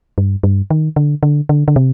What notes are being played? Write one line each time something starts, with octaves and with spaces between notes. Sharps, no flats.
G2
G2
D#3
D3
D3
D3
D3
C3